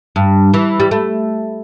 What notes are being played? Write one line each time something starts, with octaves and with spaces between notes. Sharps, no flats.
G2
E3
G3
A3